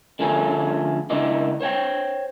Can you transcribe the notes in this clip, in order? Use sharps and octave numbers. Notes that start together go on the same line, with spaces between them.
D3 F3 A3 C#4 G#4 A4
C#2 C#3 D4 E4 D5 D#5
C5 C#5 F#5 G5